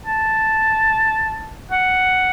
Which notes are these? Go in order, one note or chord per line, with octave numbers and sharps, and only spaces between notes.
A5
F#5